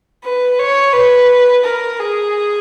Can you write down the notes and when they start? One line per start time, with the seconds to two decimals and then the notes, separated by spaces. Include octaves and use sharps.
0.24 B4
0.59 C#5
0.93 B4
1.64 A#4
1.99 G#4